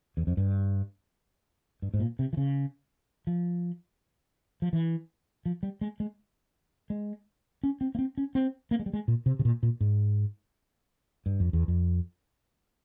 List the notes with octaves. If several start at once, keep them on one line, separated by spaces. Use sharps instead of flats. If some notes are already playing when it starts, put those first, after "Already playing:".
E2
F2
G2
G2
G#2
A#2
C3
E3
C#3
F3
F3
E3
F3
G3
G#3
G#3
G#3
C#4
C4
A#3
C4
C#4
C4
A#3
G#3
G3
G#3
A#2
C3
C3
A#2
A#2
G#2
G2
F2
E2
F2